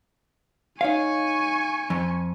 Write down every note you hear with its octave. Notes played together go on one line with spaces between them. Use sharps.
D#4 C#5 F5 G#5 C#6
F2